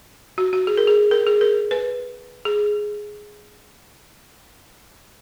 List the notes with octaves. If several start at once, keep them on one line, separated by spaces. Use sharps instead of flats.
F#4
F#4
G#4
A#4
G#4
A#4
G#4
A#4
B4
G#4